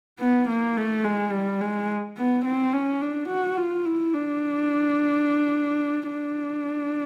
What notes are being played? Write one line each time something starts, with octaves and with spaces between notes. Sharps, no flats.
B3
A#3
A3
G#3
G3
G#3
B3
C4
C#4
D4
F#4
F4
E4
D4
D4